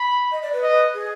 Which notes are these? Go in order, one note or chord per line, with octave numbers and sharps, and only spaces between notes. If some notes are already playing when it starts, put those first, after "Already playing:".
Already playing: B5
D#5
D5
B4
D#5
G#4